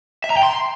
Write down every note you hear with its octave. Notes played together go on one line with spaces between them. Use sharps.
E5
A#5
G5
C6